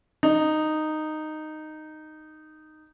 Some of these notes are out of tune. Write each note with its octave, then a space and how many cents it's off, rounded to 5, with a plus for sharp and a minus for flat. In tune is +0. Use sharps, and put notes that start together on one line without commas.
D#4 -10